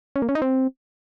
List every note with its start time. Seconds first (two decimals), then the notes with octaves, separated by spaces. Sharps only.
0.16 C#4
0.22 A#3
0.29 C#4
0.35 D#4
0.42 C4